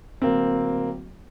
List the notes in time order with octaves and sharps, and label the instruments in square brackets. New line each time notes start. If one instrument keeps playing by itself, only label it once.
[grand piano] D1 A#3 C4